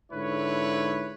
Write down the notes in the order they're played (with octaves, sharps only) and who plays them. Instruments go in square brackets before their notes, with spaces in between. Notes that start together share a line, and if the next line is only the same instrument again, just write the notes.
[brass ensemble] G#2 D3 E4 B4 C#5